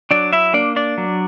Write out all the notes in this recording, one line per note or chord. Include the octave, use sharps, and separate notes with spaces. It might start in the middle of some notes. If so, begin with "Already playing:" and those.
F#3 D4 D5
E4 E5
A#3 D4 D5
D4 D5
F#3